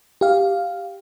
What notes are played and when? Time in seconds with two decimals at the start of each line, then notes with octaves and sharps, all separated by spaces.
0.21 G4 F5